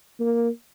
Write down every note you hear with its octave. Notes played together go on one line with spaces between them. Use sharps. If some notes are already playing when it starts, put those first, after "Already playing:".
A#3